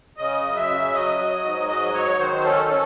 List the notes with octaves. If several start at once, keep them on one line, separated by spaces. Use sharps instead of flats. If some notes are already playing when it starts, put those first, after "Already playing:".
C#3 D#5
F#2
E5
C#3
F#3 D#5
F#3
G#2
F#3 D#5
F#3 C#5
D#3 C5
C#4 A4
C#4